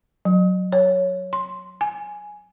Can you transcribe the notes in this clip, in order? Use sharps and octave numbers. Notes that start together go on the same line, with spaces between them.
F#3
C#5
C6
G#5